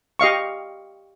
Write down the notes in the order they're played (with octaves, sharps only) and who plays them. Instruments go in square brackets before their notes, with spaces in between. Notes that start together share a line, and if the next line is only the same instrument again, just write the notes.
[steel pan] G4 D#5 F5 C#6